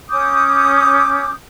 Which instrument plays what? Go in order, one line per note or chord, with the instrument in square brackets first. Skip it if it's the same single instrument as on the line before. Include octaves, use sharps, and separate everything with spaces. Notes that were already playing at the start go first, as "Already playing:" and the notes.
[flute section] C#4 D6 D#6 G6